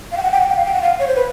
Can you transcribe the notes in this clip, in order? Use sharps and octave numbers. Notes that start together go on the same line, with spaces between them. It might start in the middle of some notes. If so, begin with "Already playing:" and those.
F5
G5
F#5
G5
F#5
G5
F5
G5
F#5
F5
C#5
C5
B4